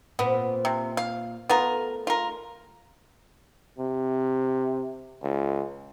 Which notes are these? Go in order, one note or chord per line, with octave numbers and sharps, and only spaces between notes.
A#2 B3 C4
C3
F5
A3 B3 F4 A#4
F4 A#4
C3
C#2